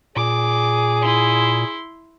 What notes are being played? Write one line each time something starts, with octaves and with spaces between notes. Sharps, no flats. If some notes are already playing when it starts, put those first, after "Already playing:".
A#2 G#4 D6
E4 C6